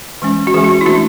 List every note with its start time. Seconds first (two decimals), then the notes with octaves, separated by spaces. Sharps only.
0.22 E3 G#3 C#4
0.47 F#4
0.54 E3 G#3 C#4 G#4
0.64 F#4
0.81 E4
0.86 E3 A3 D4 F#4